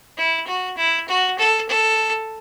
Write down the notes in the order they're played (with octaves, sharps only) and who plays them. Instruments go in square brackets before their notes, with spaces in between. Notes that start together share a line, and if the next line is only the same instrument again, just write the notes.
[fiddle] E4
F#4
E4
F#4
A4
A4